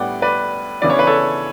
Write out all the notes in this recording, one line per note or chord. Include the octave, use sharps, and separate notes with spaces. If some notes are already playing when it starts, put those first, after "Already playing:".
Already playing: A2 G3 B3 D4 D5 F#5 G5
B4 D5
C#3 E3 B3 D4 D5
C#5
B4
A4 C#5